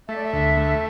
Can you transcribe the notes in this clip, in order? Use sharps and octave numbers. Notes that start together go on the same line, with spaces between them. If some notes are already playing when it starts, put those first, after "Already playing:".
A3 E5
D5
E5
D2
A3